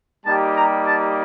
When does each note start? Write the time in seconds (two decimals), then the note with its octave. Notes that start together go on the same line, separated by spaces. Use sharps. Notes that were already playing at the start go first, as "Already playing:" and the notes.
0.25 G3 A#3 D#4 G4 A5
0.56 A#5
0.87 A5